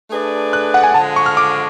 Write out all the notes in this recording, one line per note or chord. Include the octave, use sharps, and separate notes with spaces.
A3 D4 G#4 B4 D5
F#6
F#5
G#5
D3 F3 G#3 A5
C#6
F6
D6